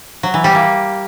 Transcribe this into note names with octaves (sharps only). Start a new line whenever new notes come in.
F#3
E3
G3
A#3